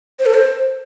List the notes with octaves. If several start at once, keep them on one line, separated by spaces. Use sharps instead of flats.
C5
A4
C5